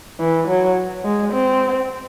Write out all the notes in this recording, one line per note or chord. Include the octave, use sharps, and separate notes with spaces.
E3
F#3
G#3
C4